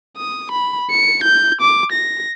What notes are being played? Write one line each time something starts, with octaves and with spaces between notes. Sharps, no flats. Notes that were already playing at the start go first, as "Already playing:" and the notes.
D#6
B5
C#7
G6
D6
A#6